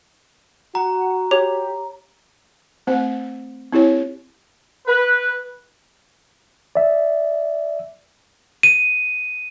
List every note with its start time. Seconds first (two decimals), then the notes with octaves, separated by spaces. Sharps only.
0.75 F#4 F#5 A#5
1.31 G4 C#5 D6 F7
2.87 A3 C4 C5 F#5
3.72 C4 E4 G4 C#5
4.87 B4
6.75 D5 E5
8.63 D#7